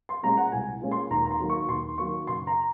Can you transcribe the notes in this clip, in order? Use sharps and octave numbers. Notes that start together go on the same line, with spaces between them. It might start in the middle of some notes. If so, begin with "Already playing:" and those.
C6
A#2 G#3 C#4 A#5
F#5
C2 G#5
A#2 G#3 C#4
C6
D#2 A#5
A#5
C6
D#3 F#3 A#3
C#6
D#2 C6
D#3 F#3 A#3 C#6
F#1 C6
A#5